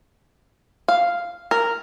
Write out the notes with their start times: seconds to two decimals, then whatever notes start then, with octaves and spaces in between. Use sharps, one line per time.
0.88 F5
1.51 A#4